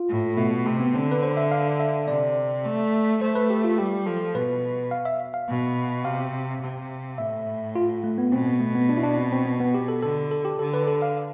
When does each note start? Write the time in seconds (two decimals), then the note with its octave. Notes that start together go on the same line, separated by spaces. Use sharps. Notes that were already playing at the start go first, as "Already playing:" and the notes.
Already playing: F4
0.09 A2
0.37 B2 A3
0.66 C3 A3
0.80 B3
0.94 D3 C4
1.11 B4
1.23 C5
1.37 E5
1.51 F5
1.80 E5
2.07 C3 D5
2.65 A3
3.21 A3 C5
3.35 B4
3.50 G4
3.64 F4
3.78 G3 G4
4.06 F3 A4
4.35 B2 B4
4.91 F5
5.05 E5
5.34 F5
5.49 B2
6.05 C3 F5
6.62 C3
7.18 A2 E5
7.75 F4
8.04 A3
8.18 B3
8.32 B2 C4
8.46 B3
8.61 A3
8.75 B3
8.89 D4
8.97 E4
9.03 D4
9.17 C4
9.32 C4
9.46 B3
9.60 B3
9.74 G4
9.88 A4
10.02 D3 A4
10.31 A4
10.45 G4
10.59 D3 A4
10.74 B4
10.87 A4
11.02 F5